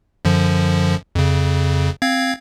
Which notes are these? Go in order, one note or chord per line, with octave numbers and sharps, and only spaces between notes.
F#2 D3 F3
F2 C#3
C4 F5 G#6